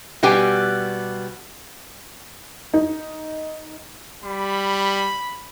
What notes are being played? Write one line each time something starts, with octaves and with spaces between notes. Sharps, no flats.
B2 G3 B3 G4 G#5
D#4
G3 B5